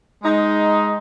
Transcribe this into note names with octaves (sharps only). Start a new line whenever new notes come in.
G#3 D#4